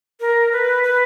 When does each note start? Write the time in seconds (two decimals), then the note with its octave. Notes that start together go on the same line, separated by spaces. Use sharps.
0.21 A#4
0.52 B4
0.83 B4